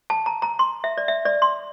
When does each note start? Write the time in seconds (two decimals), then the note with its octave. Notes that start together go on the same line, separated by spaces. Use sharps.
0.10 A5
0.26 A#5
0.42 A#5
0.59 C6
0.84 E5
0.98 D5
1.08 E5
1.25 D5
1.42 C6